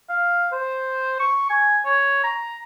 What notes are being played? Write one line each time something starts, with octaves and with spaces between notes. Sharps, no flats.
F5
C5
C#6
G#5
C#5
A#5